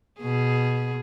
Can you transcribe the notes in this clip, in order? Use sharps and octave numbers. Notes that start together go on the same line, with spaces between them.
B2 G#4